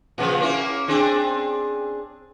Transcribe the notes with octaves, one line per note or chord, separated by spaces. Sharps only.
A#2 C#3 F3
A#3 C#4 E4
C4 D4 G#4